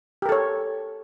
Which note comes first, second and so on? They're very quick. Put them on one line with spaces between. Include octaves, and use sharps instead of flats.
G4 A#4 A4 C#5